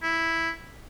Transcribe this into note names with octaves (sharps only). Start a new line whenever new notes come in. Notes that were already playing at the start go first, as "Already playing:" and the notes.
E4